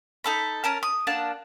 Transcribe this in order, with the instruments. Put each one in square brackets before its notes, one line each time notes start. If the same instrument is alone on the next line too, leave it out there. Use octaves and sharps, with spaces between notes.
[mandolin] D#4 A4 B5
C#4 A#4 A5
D#6
A#3 D4 F#5 A5